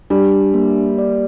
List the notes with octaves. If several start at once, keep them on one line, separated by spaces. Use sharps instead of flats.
G3 D4
A#3
D5